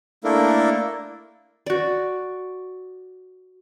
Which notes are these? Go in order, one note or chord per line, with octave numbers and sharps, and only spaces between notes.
A3 A#3 D4 E4 A4 A#4
F#4 D5